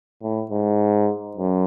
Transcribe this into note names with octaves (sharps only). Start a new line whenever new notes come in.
A2
G#2
F#2